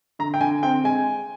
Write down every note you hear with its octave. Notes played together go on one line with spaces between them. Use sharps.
D3 A#5
G5
D3 G#5
C4 G5
G#3 G#5